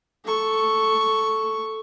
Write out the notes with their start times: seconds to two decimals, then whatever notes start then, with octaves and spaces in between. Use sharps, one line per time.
0.25 A4 C#6